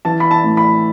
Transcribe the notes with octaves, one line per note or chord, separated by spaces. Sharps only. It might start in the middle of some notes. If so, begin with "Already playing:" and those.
E3 A5
B5
A5
A2
B5